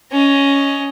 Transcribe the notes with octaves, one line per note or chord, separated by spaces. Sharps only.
C#4 D#5